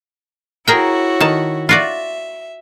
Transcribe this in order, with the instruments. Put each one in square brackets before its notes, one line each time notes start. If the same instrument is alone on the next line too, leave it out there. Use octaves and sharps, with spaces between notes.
[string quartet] E4 F#4 C#5 [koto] G#4 A#4 G5
[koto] D#3 A5
[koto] F4 F#4 D5 [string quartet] E5